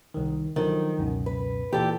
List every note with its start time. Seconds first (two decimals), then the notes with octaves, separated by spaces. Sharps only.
0.14 C2 D#3
0.56 D3 D#3 F3 F#3
0.99 C#2 F#2 B2
1.26 B4
1.73 A#2 E3 G4 A4 G5